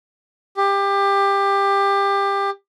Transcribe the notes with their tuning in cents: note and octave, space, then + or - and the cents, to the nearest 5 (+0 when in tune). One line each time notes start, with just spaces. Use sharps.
G4 +20